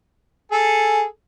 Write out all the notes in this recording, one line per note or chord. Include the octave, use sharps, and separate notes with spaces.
G#4 A4